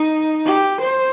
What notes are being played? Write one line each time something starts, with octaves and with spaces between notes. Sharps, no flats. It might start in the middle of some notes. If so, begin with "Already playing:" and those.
Already playing: D#4
G4
C5